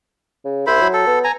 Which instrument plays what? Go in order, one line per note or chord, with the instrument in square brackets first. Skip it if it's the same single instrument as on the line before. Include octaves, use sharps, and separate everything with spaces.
[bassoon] C#3
[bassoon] C2 [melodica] E4 C5 B5
[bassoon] F#3
[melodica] A4
[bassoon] B3
[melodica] G#5 A#5